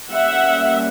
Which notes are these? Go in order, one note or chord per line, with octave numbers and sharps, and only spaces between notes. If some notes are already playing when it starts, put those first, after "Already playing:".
G3 A#3 C#4 E5 F#5